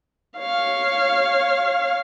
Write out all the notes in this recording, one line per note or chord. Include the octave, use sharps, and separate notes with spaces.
C#5 F5